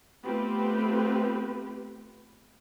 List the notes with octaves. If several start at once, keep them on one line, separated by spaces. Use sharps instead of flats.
A3 B3 C4 F4 G4 B4